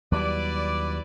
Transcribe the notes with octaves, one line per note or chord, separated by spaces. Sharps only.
D#2 F#3 G3 E4 B4 D5